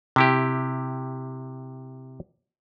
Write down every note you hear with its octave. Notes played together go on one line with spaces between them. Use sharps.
C3 E4 G4